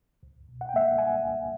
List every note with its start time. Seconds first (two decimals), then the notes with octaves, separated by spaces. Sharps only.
0.23 C#2
0.49 B2
0.61 F#5
0.69 G5
0.74 A#3 E5 F#5
0.98 G3 F#5 G#5
1.24 C#2